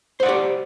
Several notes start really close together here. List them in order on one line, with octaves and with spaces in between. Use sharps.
C5 F#5 D5 G4